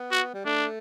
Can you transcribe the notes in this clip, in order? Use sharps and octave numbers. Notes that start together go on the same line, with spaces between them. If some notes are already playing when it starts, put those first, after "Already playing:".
Already playing: B3
F#4
G3
A3 D4